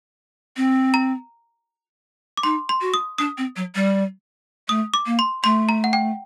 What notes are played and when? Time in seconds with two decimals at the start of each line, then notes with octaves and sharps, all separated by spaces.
0.57 C4
0.94 A#5
2.37 D6
2.43 D#4 C6
2.69 C6
2.81 F#4
2.94 D#6
3.18 D4 D#6
3.38 C4
3.56 F#3
3.75 G3
4.69 A3 D#6
4.94 D6
5.06 A#3
5.19 C6
5.44 A3 C6
5.69 A#5
5.84 F#5
5.93 G5